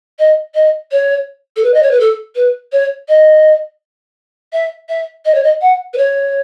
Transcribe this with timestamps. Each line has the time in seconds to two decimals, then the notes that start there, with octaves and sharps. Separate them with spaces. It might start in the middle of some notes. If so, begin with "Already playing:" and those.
0.19 D#5
0.55 D#5
0.91 C#5
1.56 A4
1.63 B4
1.74 D#5
1.82 C#5
1.91 B4
2.00 A4
2.35 B4
2.72 C#5
3.08 D#5
4.53 E5
4.89 E5
5.25 D#5
5.34 C#5
5.43 D#5
5.61 F#5
5.93 B4
5.97 C#5